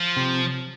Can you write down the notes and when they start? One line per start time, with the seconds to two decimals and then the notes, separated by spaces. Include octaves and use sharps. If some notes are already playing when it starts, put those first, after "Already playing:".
Already playing: F3
0.16 C3